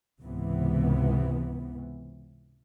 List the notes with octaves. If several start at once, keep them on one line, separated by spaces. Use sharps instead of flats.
C#2 G#2 C3 E3 B3